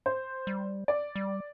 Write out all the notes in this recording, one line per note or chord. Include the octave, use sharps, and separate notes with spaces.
C5
G3
D5
G3